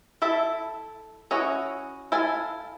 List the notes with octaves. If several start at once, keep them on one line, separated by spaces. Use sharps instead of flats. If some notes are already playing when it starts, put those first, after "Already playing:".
E4 A4 E5
C#4 E4 F#4 D#5
E4 A4 F5 G#5